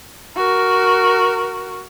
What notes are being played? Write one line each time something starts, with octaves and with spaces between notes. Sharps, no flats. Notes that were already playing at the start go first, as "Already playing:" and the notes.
F#4 A#4